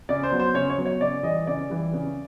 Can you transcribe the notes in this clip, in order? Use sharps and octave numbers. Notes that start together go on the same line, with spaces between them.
C#3 D5
C5
F#3 B3
C5
C#3 C#5
C#5
F#3 B3
C#5
C#3 D5
E3 G3 D#5
C#3 D5
E3 G3
C#3